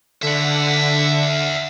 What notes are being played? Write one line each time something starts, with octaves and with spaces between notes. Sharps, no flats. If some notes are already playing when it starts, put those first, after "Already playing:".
D3 E5 F#5